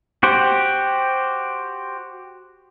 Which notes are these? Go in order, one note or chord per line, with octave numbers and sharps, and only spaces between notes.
F#4 G4 C5